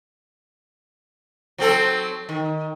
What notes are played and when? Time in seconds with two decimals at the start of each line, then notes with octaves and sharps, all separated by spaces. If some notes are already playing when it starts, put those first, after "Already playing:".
1.58 F#3 C4 A4
2.29 D#3